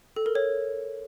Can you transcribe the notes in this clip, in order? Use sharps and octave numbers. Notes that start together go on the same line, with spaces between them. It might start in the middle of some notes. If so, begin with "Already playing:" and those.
A4
A#4
C#5